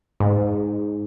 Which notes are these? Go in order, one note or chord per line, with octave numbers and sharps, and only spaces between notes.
G#2